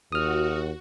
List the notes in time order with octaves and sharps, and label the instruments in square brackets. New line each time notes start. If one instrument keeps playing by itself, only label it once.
[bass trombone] D#2 [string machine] F#4 [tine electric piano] D#6 F6